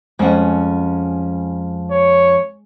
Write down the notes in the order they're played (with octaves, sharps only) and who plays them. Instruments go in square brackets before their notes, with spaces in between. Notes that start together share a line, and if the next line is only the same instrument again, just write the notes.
[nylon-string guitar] F2 C#4 F#5 [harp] G#3
[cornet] C#5